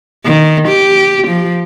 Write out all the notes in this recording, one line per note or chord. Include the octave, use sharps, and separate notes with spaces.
D#3
G4
F3